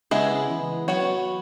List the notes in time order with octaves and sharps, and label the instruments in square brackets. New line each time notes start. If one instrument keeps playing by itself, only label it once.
[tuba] C#3 [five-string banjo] G#3 B3 E4 G#4
[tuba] E3
[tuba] F#3 [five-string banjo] B3 F#4 C#5